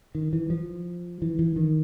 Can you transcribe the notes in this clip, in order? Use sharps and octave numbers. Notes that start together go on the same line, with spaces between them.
D#3
E3
F3
E3
E3
D#3